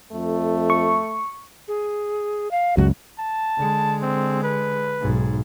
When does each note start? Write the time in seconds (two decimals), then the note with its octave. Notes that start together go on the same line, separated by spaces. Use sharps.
0.12 F2 A3
0.70 C#6
1.68 G#4
2.51 F5
2.77 C#2 F#2 F#4
3.19 A5
3.57 D3 G#3
4.02 C4
4.43 B4
5.01 B1 G#2